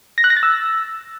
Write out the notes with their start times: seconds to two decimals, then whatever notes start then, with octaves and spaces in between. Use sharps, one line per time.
0.18 A#6
0.24 F#6
0.30 A#6
0.37 A6
0.43 E6